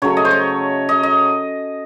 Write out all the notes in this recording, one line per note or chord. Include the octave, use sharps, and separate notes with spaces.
C#3 F#3 A3 C#5
D#5
C5
C#5
D#5
D#5